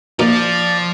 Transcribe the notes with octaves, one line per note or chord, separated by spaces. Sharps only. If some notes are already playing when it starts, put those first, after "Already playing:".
A#2 F3 D#4 D5